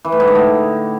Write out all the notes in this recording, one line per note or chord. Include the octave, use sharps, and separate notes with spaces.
E3
A2
G#2
D3
A2